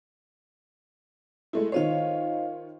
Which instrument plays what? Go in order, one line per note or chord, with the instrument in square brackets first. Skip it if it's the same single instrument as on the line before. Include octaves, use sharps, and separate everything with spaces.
[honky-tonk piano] G#3 A3 E4
[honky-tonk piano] D#3 F4 C#5 [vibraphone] C5 D#5 F5